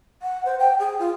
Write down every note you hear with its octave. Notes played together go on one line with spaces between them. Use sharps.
F#5
C5
G5
G#4
F4